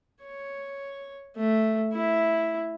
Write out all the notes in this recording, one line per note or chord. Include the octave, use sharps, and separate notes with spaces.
C#5
A3
E4